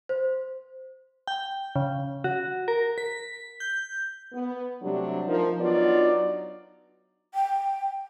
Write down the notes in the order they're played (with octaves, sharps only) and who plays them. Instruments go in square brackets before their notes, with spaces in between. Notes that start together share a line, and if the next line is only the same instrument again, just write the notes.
[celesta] C5
[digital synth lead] G5
C#3
F#4
A#4
B6
G6
[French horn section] B3
C3 F#3 G3 A3 D4 G4
F3 D#4 A#4
F#3 B3 D4 D#4 F4 D5
[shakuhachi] G5